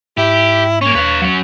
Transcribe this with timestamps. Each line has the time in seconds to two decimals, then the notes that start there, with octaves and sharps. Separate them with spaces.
0.17 G#2 E4 G4
0.81 A#3 C#4 C#5
0.95 D#2 B4 F5
1.21 F#3 C#4